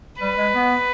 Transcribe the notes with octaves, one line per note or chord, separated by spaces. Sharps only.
G3 B4
G#3
B3